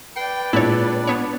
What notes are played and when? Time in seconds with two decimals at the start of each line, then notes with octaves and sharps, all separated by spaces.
0.16 B4 D5 G5 C7
0.53 A#2 G#3 D4 E4 C#5 A6
1.07 B3 C#5